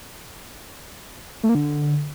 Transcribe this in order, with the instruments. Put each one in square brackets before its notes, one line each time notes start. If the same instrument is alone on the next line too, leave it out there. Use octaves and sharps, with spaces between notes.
[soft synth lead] A3
A#3
D3